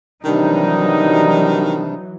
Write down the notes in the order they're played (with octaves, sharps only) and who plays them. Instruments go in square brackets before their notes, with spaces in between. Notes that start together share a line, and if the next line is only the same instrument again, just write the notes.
[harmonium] C3 G3 D4 [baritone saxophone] D#3 [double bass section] E3 F#3 [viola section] D#4